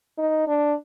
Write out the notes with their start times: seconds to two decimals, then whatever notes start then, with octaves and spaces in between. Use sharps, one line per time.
0.18 D#4
0.47 D4